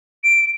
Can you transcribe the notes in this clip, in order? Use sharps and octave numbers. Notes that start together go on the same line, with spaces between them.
D7